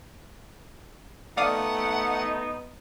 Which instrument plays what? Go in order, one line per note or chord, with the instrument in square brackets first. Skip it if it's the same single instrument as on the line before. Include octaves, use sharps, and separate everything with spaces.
[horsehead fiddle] A3 [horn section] B3 D#4 [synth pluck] D5 F5 D#6 [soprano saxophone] F#5